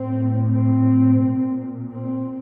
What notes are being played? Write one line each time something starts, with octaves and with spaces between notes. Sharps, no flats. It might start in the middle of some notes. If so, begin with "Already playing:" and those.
Already playing: A2 C4
C4
A#2
C4